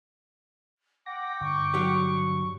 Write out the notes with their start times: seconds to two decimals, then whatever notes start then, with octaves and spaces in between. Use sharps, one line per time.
1.06 F#5 G5 D6 A#6
1.41 G2 D3 C#6
1.74 F#3 G4